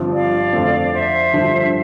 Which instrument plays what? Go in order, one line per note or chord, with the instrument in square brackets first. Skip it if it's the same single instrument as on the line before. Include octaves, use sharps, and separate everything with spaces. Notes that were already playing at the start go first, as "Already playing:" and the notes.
Already playing: [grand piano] G1 G2 F3 C4 F4
[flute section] D5 F5
[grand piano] F2 D3 A3 C4
[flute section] C5 E5
[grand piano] G2 D3 F3